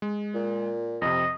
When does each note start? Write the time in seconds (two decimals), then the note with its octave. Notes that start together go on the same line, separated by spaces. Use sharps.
0.02 G#3
0.34 A#2
1.02 F2 C3 D#5